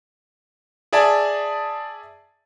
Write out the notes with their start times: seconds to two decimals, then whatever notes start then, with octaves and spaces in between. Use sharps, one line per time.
0.93 G#4 D5 E5 G#5 A5